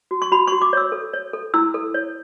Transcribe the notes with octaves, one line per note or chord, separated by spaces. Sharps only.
F#4
C#6
F#4 B5
F#4 C#6
D6
C#5 E6
A4
C#5
A4
E4 E6
A4
C#5